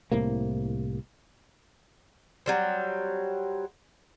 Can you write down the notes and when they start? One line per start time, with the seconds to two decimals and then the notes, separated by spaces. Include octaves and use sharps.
0.12 C2 A2 C3 A#3
2.46 F#3 G3 C4